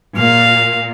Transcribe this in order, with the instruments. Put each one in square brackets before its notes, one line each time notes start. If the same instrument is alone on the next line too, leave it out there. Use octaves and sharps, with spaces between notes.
[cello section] A#2 [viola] F5